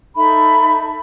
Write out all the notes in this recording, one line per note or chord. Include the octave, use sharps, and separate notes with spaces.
D#4 A4 E5 B5